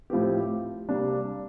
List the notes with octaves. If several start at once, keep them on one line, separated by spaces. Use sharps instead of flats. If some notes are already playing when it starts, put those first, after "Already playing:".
A2 F3 C4 G4
C3 G3 A#3 D4